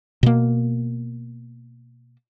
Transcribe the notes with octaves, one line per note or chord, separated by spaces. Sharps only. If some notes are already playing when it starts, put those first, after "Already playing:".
B2 A#3